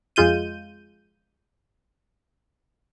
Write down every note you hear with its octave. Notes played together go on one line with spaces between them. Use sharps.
F2 G#3 F4 G6 D#7